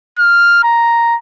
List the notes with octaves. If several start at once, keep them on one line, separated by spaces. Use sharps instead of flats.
F6
A#5